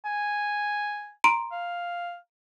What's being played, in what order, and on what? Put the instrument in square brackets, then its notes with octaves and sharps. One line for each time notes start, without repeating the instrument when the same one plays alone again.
[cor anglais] G#5
[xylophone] A#5 C6 D7
[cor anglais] F5